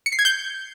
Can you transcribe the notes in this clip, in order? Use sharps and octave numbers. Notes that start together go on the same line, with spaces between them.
C#7
C7
G#6
G6